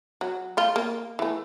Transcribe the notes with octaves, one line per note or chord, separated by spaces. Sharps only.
F#3
A3 F4
A#3
E3 A3